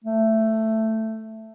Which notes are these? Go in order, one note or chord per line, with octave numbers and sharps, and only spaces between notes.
A3